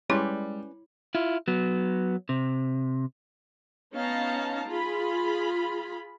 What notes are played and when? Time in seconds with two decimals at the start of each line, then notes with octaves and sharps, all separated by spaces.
0.10 G3 G#3 C#4 E4 B4 C#5 D5 C6
1.15 E4 F4
1.48 F#3 B3
2.29 C3
3.94 B3 C#4 D#4 F5 A5 A#5
4.67 F4 G#4 B5